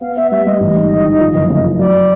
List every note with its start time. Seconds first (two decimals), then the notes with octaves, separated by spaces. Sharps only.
0.01 B3 F5
0.16 B3 E5
0.31 G3 E5
0.46 G3 D#5
0.60 A1
0.76 G#2
0.90 D#3
1.05 D#3
1.20 F3
1.34 F#1
1.50 C#3
1.65 F3
1.79 F#2 D5